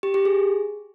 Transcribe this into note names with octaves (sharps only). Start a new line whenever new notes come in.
G4
G4
G#4